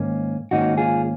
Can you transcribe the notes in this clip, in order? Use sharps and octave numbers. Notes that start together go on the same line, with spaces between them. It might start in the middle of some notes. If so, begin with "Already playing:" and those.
Already playing: G#2 D#3 A#3 C#4
G#2 D#3 A#3 C#4 D#4 F#4
F4 G#4